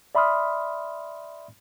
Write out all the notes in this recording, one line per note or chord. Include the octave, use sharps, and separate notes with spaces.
D5 E5 B5 C6 D#6 F6